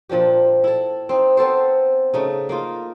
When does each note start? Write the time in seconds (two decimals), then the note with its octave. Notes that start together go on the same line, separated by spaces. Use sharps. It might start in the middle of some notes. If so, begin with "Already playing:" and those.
0.09 A#2 F3 D4 G4
0.64 E4 A4
1.09 C4 D#4
1.37 B3 C4 A4 C5
2.14 C#3 A3 D#4
2.49 A#3 D#4 F4